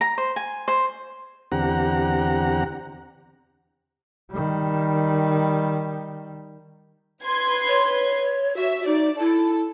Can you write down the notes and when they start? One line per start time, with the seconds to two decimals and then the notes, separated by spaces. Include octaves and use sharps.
0.01 A#5
0.18 C5
0.36 G#5
0.68 C5
1.52 E2 D3 C4 G4 F#5 A#5
4.31 D#3 G3
7.24 B4 C6 G#6
7.68 C#5
8.57 F#4 E5
8.86 D#4 D5
9.19 E4 A4